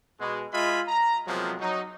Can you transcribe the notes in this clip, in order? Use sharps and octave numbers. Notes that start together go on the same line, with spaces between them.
B2 G#3
G#3 F4 D#5 E5 G#5 B5
A#5
C3 F3 F#3 G#3 A#3 B3
F#3 D#4